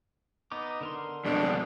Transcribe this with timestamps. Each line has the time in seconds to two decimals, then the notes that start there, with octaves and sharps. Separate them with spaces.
0.52 B3 D#4 D6
0.81 D3 A#4 C6
1.25 F2 B2 D4